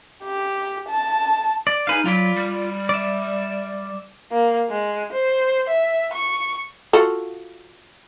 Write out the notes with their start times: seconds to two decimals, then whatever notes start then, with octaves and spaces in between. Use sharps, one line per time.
0.24 G4
0.89 A5
1.67 D5
1.87 D#4 G#4 B4 F5
2.06 F#3 F4 D5 B5
2.35 G3
2.89 D5 E5
4.31 A#3
4.70 G#3
5.12 C5
5.68 E5
6.13 C#6
6.93 F4 F#4 A4